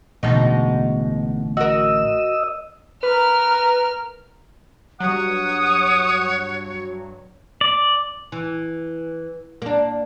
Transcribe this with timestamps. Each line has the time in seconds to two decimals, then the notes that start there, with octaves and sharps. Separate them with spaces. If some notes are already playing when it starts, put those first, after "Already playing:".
0.23 A1 B2 D3 G#3 D#4
1.57 F#4 A#4 D#5 E6
3.03 A#4 B4 F6
5.00 G2 F#3 C#5 F#5 D#6
7.61 D5
8.32 E3
9.62 A#3 D4